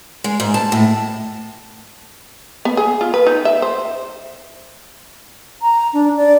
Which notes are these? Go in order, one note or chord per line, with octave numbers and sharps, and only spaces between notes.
G#3
G#2
A5
A2
B3
G#4
F4
B4
D#4
E5
C5
A#5
D4
D5